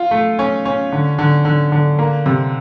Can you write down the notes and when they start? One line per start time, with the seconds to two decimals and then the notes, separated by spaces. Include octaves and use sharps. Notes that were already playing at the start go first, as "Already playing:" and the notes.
Already playing: F4
0.11 A3
0.39 C#4
0.65 C#4
0.92 D3
1.19 D3
1.45 D3
1.72 D3
1.99 A#3
2.26 C3